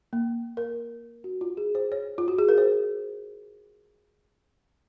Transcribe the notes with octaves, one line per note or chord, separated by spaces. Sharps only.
A#3
A#4
F#4
F4
G#4
C5
C#5
F4
F#4
G#4
A#4
C5